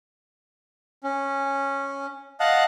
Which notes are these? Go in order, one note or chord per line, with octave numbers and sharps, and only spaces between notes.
C#4
D#5 F5 F#5 A5 F#6